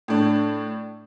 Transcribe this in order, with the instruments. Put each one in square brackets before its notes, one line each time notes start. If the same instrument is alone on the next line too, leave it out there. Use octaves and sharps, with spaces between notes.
[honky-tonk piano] A2 D4